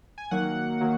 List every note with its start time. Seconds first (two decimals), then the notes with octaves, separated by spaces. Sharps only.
0.18 G#5
0.31 D#3 F#3 A#3 F#5
0.81 D#3 F#3 A#3